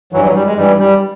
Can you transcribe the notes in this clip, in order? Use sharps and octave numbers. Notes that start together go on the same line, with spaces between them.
G2 E3 F#3
F#3
G3
G#3
G2 E3 G3
G3